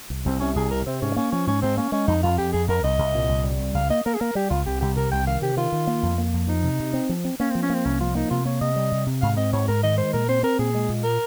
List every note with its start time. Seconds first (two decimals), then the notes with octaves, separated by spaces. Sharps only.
0.10 C2
0.25 C2 C4
0.40 C3 C#4
0.56 C2 G#4
0.71 C3 A#4
0.86 C3 C4
1.02 G#2 C#4
1.16 A#3 C#4
1.32 F3 C#4
1.47 G#2 C#4
1.62 G#2 C4
1.77 A#3 C#4
1.92 G#3 C#4
2.07 F2 D#4
2.23 F2 F4
2.38 F2 G4
2.53 F2 G#4
2.68 F2 A#4
2.84 C2 D#5
2.98 C2
3.15 A#2
3.29 C2
3.44 G3
3.60 C2
3.74 C#2 F5
3.90 A#3 D#5
4.06 A#3 A#4
4.14 G#4
4.21 A#3 A#4
4.35 G3 G4
4.50 C#2 F4
4.66 C2 G4
4.81 C2 G4
4.97 C3 A#4
5.12 C2 G5
5.27 D#3 F5
5.42 C3 G4
5.57 D#3 F4
5.72 D#3
5.87 A#3
6.03 F2
6.18 A#3
6.34 F2
6.48 F3 D#4
6.63 C3
6.79 C3
6.94 C4
7.09 F3
7.25 C4
7.40 A#3 C#4
7.51 C4
7.55 F3
7.63 C#4
7.70 A#3 C4
7.85 C2 C#4
8.00 F3 F4
8.15 A#3 D#4
8.31 C3 F4
8.46 A#3 C#5
8.61 C3 D#5
8.76 G3
8.92 C3
9.06 C3
9.21 G#2 F5
9.37 C4 D#5
9.53 G#2 C#5
9.68 G#2 A#4
9.83 D#3 D#5
9.98 G#3 C5
10.13 A#2 A#4
10.29 C4 C5
10.43 C4 A#4
10.59 A#2 G#4
10.75 G#3
10.89 A#2
11.04 A#4